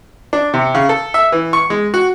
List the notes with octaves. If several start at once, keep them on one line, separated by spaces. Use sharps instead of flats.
D4
C3
C#3
A4
E5
E3
C#6
G#3
F#4